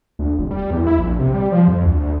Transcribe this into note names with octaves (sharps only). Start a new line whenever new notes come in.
D2
F1
G3
E2
E4
A#1
C3
G3
F3
F2
D2